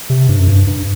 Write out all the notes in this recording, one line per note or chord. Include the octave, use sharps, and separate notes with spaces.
C3
G2
F#2
G2
G2